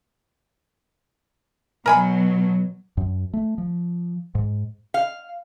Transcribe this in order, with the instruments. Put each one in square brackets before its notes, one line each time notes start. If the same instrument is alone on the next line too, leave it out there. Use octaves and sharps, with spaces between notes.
[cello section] B2 F#3 [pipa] A#4 G#5 B5
[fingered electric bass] F#2
A3
F3
G#2
[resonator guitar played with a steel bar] F5